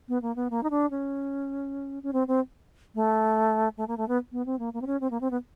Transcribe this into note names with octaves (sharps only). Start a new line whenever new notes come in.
B3
A#3
B3
A#3
D#4
D4
C#4
C#4
C4
C4
A3
A3
A#3
A3
B3
B3
C4
A#3
A#3
C4
C#4
C4
A#3
C4
B3